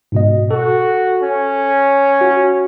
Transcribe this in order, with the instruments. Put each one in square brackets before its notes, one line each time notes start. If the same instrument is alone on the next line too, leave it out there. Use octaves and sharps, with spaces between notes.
[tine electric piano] G#2 B2 D#5
[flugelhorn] F#4 [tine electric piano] A4
[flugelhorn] C#4
[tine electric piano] F#4